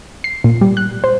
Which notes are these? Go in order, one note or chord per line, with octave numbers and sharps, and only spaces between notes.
C7
A#2
G3
F#6
C5